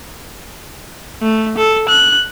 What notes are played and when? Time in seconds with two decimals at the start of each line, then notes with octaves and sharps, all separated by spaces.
1.22 A3
1.58 A4
1.89 F#6